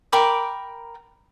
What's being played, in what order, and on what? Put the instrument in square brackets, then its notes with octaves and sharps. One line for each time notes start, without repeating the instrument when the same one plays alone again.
[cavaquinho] A#4 G5 B5 D6